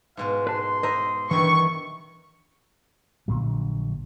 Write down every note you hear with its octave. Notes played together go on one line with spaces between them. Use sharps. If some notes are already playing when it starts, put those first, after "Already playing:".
G#2 B2 G#3 F5
B4 A5 C6
B4 C5 D#5 E5 A#5
G2 D#3 E3 E4 C#6
A#1 A#2 D3 F#3